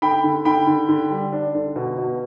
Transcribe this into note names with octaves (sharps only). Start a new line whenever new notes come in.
D3 G5 B5
D3
D3 G5 B5
D3
D3
G3
D4
D3
B2
B2